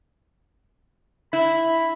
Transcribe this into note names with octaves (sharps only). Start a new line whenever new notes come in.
E4 B5